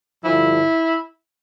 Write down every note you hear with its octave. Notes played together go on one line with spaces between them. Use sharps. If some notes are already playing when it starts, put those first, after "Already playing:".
G2 D3 F3 E4